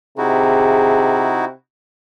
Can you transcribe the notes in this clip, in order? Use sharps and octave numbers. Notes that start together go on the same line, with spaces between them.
C3 D#4 E4 F#4 G#4